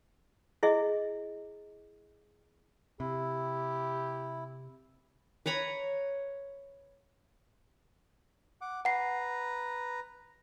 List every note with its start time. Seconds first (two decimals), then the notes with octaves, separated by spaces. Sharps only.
0.63 E4 G#4 D#5
3.00 C3 E4 G4
5.46 B4 C#5 A#5 B5
8.61 F#5 D6
8.85 B4 F#5 A#5 C7